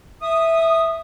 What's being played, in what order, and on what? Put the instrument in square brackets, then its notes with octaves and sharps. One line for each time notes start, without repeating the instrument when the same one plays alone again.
[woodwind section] E5 D#6